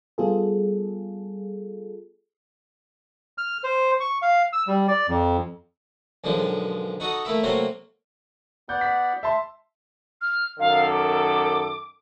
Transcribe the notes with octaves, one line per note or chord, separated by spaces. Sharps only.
G3 B3 F4 G#4 A4
F6
C5
C#6
F5
E6
G3
D5
F2
B1 F#2 D3 F3 G#3
D#4 F#4 A4 D#5 F#5
A3 A#3 E4 E5
C3 F#3 A3 A#3 F#4 C6
B3 D5 F#5 G6
B6
E5 A5 C6
F6
F#2 D#3 A4 F5
D6